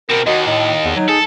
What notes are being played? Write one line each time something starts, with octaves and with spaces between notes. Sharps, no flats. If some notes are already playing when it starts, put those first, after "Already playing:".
B2 C4 A#4
D#2 F#4 D#5
A2 D#5
E2
F#3 D#4
G#4 A4